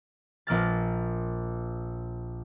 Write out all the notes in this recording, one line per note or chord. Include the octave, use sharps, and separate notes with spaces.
A#1 A#3 F6 A6